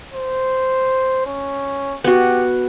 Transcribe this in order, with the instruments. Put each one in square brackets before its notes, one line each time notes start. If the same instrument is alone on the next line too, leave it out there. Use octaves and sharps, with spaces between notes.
[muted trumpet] C5
C#4
[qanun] B3 F#4 [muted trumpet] G4